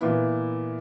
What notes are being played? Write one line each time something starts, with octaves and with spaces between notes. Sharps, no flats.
A#2 E3 B3 E4